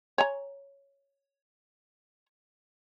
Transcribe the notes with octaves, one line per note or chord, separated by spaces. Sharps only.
C#5 G#5 A#5